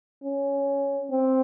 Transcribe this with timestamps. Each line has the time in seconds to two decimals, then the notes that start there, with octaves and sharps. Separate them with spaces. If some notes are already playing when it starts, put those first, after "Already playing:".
0.23 C#4
1.10 C4